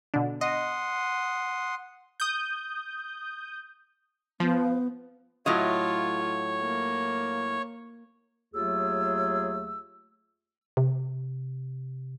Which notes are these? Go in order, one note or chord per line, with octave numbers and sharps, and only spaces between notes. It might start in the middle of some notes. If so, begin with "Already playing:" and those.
B2 D3
D#5 F#5 C6 D#6
D#6 G6
F3 B3
A2 F#3 F4 C#5 D#5
A#3
D#2 F#3 A3 F4 G#4 E6
C3